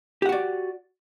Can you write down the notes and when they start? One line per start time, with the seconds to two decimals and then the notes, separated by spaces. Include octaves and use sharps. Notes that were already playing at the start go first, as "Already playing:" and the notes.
0.22 G4
0.26 F#5
0.29 F#4
0.32 D5